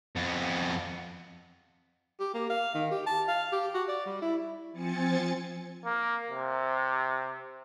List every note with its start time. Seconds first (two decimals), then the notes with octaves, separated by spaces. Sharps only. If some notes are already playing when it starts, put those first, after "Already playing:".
0.16 F2 B3
2.20 G4
2.34 A#3
2.50 F5
2.74 D#3
2.91 G4
3.06 A5
3.28 F5
3.52 G4
3.74 F#4
3.88 D5
4.06 G3
4.22 E4
4.72 F3 C4 G#5 A6 C#7
5.85 A#3
6.31 C3